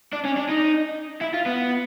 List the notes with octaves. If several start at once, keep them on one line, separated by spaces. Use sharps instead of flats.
D4
C#4
D4
D#4
E4
F4
B3